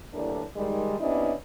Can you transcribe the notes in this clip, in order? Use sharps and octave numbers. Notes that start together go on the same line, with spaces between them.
D2 A2 E3 G3 A#3 D4
D#3 G3 G#3
C3 B3 C#4 D4 E4 D#5